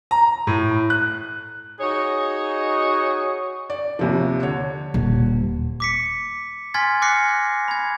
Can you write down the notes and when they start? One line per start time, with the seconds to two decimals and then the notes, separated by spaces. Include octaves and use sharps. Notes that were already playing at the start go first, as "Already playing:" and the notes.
0.11 A#5
0.47 A2
0.90 F#6
1.80 D#4 F#4 G#4 C#5 D#5
3.70 D5
3.99 D#2 C3 F3
4.43 D3 C#5
4.94 D#1
5.80 D6 B6 C#7
6.74 G#5 C6 F6 G#6 A6 B6
7.02 D6 F6 F#6 A#6 C7 C#7
7.68 B5 G#6